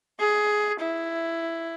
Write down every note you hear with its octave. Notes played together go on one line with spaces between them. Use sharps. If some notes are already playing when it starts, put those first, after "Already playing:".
G#4
E4